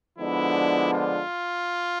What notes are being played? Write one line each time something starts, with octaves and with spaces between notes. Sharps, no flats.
D3 F3 G#3 B3 D4 E4
F4